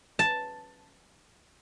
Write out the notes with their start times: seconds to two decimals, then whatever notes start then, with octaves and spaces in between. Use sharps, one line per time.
0.19 A5